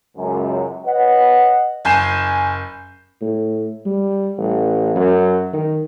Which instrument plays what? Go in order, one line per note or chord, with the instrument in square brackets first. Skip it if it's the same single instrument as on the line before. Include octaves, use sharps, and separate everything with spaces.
[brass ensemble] C#2 F#2
B4 C#5 D#5 F#5
[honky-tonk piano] F#1 G#5 G6 C7 E7
[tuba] A2
G3
A1
F#2
D#3